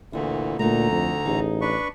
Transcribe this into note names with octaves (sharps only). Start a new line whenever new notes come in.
D2 A#2 D3 E3 E4
D2 A#2 D3 A3 D#4 A#5
F2
A1 D#4 G#4
D4 B4 C#6